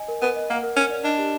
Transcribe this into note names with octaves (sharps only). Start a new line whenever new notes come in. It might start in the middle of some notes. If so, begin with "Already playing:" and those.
Already playing: D#5 G#5
A#4
B3 A#4
D#5
A#3 F#5
A#4
C#4 A#4
D5
D4 D#5
G4